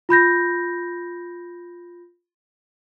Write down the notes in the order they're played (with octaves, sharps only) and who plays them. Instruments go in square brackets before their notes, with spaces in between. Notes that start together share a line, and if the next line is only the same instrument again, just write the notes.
[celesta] F4 B5 G6 A#6